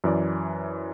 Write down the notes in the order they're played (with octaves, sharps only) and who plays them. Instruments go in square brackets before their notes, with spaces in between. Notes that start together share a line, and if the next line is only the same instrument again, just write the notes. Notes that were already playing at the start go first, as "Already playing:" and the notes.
[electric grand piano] F#2 E3 D5